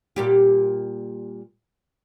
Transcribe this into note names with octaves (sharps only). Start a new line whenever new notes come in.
A#2 G3 G4